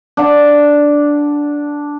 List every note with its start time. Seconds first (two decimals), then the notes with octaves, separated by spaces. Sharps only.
0.17 D4 F#5